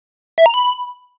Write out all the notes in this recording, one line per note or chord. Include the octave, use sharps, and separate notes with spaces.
E5
A#5
B5